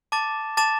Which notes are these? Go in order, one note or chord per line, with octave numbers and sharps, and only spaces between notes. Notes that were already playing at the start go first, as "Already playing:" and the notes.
A5 D6 A6 E7
A5 D6 A6 E7